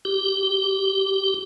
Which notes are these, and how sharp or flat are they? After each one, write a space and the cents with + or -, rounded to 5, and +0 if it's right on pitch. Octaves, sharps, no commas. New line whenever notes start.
G4 -15